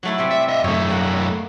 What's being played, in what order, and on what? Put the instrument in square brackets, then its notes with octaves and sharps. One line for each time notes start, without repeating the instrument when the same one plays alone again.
[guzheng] F#3 A3 E4
C3 G3 C4
[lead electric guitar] E5
D#5 E5
[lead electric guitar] F#2 A3 [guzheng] C#5
[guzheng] A#3 F#5